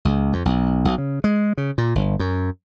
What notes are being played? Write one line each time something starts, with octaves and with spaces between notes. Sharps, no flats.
C#2
F2
B1
B1
C#3
G#3
C#3
A#2
G1
F#2